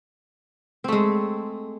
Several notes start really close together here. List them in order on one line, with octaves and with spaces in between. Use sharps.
C4 A3 G#3